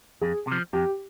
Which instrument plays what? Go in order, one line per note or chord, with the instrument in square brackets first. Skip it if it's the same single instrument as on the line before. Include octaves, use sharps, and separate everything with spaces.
[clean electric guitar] F2 [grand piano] G#4
[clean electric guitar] C3 F3
[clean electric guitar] F2 [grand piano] G4